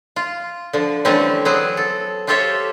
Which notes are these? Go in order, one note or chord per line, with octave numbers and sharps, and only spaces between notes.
F4
D3 F3
D3 E3 G3 A3 C4 C#4
F#3 B3 C4 G#4
A4
F4 G4 A4 C5 C#5 E5